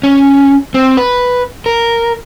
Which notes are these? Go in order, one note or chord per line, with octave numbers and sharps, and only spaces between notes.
C#4
C4
B4
A#4